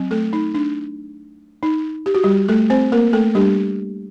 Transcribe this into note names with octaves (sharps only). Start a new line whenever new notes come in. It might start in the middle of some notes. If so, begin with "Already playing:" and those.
Already playing: F#3 C4
A3 A4
D#4
D4
D#4
G4
F#4
G3 G4
A3 A4
C4 C5
A#3 A#4
A3 A4
G3 D4 G4